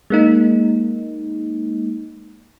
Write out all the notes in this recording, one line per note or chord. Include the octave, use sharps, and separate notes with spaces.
G#3 A#3 D#4